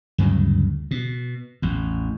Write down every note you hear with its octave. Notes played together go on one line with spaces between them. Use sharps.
D2 G2 C#3 F#3
B2
A1 E2